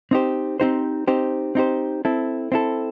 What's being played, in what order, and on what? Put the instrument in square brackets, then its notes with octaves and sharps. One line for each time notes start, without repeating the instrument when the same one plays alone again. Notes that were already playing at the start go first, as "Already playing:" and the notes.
[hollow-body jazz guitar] C4 D#4 G4 C5
C4 D#4 G4 C5
C4 D#4 G4 C5
C4 D#4 G4 C5
C4 E4 A4
C4 E4 A4